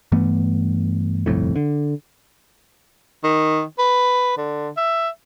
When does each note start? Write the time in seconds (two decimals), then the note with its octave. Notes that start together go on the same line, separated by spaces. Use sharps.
0.12 G2 E3 A3 B3
1.26 G1 C2 F2 A2
1.56 D3
3.24 D#3
3.79 B4
4.38 D3
4.77 E5